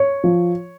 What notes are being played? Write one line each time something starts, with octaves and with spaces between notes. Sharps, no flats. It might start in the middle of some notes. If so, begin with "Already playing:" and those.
Already playing: C#5
F3